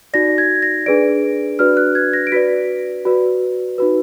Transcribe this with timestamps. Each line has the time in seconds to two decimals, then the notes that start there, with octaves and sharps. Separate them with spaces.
0.14 D#4 F#4 D5 A#6
0.38 G#6
0.62 A#6
0.86 D4 G#4 B4 D5 D7
1.59 D4 F#4 B4 D5 F6
1.77 F#6
1.95 G#6
2.13 A#6
2.27 D7
2.32 F#4 B4 D5 B6
3.05 F#4 B4 D5
3.78 D#4 F#4 B4